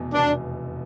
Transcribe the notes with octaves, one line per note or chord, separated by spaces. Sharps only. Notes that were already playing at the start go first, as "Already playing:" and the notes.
Already playing: F1 E2 B2
F1 E2 B2 D4